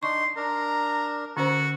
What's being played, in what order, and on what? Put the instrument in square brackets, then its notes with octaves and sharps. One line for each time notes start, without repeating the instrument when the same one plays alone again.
[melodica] D4 D#4 [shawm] C6 [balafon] C#6
[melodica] D4 A#4 [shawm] A#5
[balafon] D3 C#4 C5 [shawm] F#4 [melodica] A4